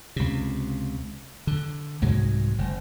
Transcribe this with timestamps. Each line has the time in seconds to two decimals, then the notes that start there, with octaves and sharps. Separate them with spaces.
0.16 C#2 C3
1.47 D3
2.02 C2 G#2 F#3 G#3
2.58 F#1